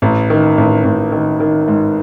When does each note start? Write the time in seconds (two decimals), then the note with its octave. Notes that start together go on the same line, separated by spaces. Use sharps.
0.02 A1
0.30 D#3
0.58 A1
0.85 A1
1.12 D#3
1.40 D#3
1.68 G#2